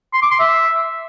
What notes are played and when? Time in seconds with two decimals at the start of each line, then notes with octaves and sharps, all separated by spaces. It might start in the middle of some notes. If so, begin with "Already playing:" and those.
0.13 C6
0.22 D6
0.31 C6
0.39 E5